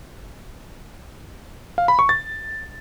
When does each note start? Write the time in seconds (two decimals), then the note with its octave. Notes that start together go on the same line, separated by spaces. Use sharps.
1.78 F5
1.88 B5
1.99 C#6
2.09 A6